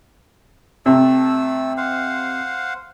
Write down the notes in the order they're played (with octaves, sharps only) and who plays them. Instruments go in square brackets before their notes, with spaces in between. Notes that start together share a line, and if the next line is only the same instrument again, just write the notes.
[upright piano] C3 [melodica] A3 A4 E6
[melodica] C5 F5 F#5